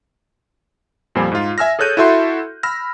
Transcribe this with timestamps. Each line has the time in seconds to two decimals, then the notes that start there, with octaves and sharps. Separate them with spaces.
1.15 F2 A#2 G3 C5 G#5
1.32 G#2 F4
1.58 E5 G#5 E6 F6 A#6
1.79 G#4 A4 C#5 F#6 G6 D#7
1.97 E4 F#4 A4 E5 C6
2.63 B5 E6 F6 A#6